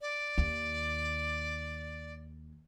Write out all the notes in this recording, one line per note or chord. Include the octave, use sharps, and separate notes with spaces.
D5
D#2